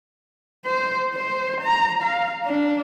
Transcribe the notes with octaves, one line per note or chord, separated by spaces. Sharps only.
C5
C5
A#5
F5
D4